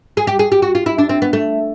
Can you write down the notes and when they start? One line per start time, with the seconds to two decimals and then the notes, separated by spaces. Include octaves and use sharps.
0.17 G#4
0.27 G4
0.39 G#4
0.52 G4
0.62 F#4
0.75 F4
0.86 E4
0.98 D4
1.09 C4
1.22 B3
1.33 A3